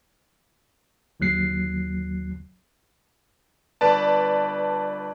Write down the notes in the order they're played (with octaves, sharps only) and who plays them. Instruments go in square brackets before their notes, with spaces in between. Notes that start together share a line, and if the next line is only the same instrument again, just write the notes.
[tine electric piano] G1 D#2 F#3 F#6 C7
[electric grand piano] G1 B4 D5 A5